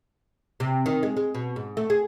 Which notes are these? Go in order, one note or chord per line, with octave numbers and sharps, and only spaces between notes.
C3
D#3
G#3
G#3
B2
G#2
A3
G#4